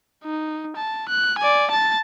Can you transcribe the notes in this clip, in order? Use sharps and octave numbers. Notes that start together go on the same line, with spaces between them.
D#4
A5
F#6
D5 G#5
A5 A6